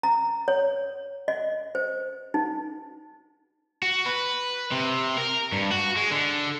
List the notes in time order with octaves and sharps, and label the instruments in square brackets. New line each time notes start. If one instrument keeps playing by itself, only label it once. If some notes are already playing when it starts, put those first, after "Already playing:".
[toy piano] A#5
C#5
D#5
C5
D#4
[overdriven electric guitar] F#4
B4
C3
A#4
G2
F#4
G#3
D3